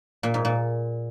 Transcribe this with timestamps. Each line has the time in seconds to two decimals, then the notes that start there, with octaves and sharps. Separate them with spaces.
0.23 A#2
0.34 G#2
0.45 A#2